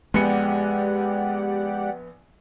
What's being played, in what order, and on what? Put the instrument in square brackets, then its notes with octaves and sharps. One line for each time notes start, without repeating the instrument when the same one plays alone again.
[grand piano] A#1 B3 C#7 [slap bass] G#3 [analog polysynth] G4 D5 F#5